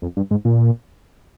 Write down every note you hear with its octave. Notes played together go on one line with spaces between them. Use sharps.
F2
G2
G#2
A#2